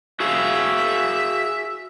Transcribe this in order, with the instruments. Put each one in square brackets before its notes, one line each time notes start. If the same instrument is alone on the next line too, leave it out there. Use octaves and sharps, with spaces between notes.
[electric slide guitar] F#4 G#4 F5 [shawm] E5